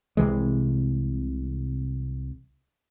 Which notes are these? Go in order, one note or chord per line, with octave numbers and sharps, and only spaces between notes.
C2 C3 E3 G#3